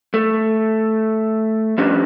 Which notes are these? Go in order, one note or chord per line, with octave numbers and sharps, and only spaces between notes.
A3
F3 G3 C#4 D4 B4 D#5